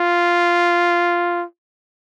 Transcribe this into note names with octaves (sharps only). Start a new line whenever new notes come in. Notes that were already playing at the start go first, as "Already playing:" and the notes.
Already playing: F4